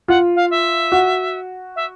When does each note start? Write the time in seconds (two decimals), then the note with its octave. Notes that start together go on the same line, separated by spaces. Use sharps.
0.08 F4 F#5
0.36 F5
0.51 E5
0.92 F#4
1.76 E5